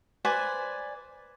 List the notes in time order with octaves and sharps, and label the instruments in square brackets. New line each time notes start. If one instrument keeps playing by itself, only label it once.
[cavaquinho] B4 C5 D5 G#5